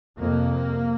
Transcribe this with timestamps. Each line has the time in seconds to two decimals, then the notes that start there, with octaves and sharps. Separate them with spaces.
0.18 F2 C3 A#3